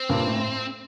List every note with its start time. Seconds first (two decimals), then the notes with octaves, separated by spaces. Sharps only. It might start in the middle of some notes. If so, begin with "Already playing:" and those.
Already playing: C4
0.09 G2 A#2
0.27 A2